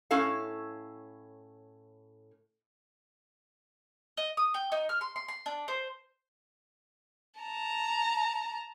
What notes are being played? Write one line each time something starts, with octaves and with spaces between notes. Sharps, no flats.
A2 C#4 E4 A4 F5
D#5
D#6
G5
D#4
F6
C6
C6
C6
D4
C5
A5 A#5